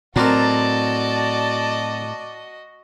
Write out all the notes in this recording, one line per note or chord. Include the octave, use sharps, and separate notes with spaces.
A2 F#3 C4 F#4 A#4 D5 D#5 A5